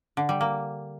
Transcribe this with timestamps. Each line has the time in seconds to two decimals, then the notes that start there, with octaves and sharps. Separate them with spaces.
0.17 D3
0.29 G3
0.41 A#3